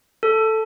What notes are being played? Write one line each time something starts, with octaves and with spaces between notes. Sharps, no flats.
A4